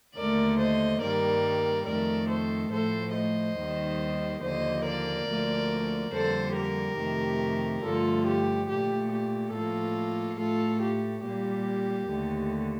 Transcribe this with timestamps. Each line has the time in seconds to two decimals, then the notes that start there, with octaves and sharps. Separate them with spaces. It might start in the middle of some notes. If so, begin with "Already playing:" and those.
0.16 D#2 D3 A3 A#4 D5
0.59 C5 D#5
1.01 G2 D#3 G3 A#3 A#4 D5
1.86 F2 D#3 A3 A#4 D5
2.29 A4 C5
2.72 A2 F3 A3 A4 C5
3.14 C5 D#5
3.58 D#2 D#3 G3
4.42 D#2 D3 F3 A#3 C5 D#5
4.85 A#4 D5
5.28 D2 D3 F3 A#3
6.13 F2 D3 G3 A#3 A4 C5
6.56 G4 A#4
6.98 F2 C3 D#3 A3
7.83 G2 D3 F3 A3 F4 A4
8.26 G4
8.69 A#2 A3 G4
9.11 G4
9.53 A2 F3 A#3 F4 A4
10.39 A2 A3 F4 A4
10.82 G4
11.24 A#2 G3 A#3 G4
12.10 D#2 D3 A3